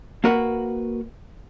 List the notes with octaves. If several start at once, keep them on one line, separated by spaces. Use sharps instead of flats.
A#3 F#4 A#4 B4 F#5